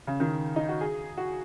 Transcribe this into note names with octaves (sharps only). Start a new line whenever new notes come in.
C#3
D#3
D#4
F#4
G#4
F#4